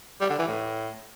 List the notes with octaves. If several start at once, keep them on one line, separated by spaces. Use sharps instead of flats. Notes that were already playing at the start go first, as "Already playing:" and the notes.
G3
D3
E3
A2